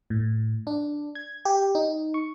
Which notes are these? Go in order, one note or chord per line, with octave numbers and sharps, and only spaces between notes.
A2
D4
G#6
G4
D#4
C#6